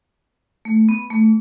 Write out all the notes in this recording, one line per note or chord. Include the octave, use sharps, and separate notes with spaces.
A3
B3
A3